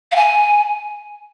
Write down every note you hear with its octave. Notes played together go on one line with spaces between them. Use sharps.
F5
G#5